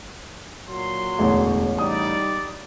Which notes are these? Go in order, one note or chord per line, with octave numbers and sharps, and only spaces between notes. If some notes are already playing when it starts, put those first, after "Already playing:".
A#2 F#3 C6
E1 A1 D2 C#5
G3 D#4 D5 D#6